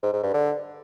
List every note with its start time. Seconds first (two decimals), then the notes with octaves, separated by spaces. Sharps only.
0.03 G#2
0.13 G#2
0.23 G2
0.34 D3